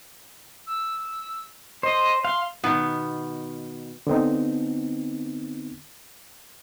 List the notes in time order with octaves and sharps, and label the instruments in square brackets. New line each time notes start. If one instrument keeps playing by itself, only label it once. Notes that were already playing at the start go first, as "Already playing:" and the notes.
[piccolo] E6
[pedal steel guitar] C5 [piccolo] D#5
[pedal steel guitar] F5 [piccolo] C6
[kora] B2 D#3 B3
[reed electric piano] D3 B3 C4 D#4